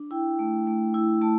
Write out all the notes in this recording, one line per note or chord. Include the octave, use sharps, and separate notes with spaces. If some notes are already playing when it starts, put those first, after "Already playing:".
Already playing: D4
E4 G5
A3
A3
E4
A3 A5